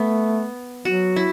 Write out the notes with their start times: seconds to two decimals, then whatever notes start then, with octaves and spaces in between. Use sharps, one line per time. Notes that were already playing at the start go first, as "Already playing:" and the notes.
Already playing: A3 B3
0.85 F#3 F#4
1.16 E4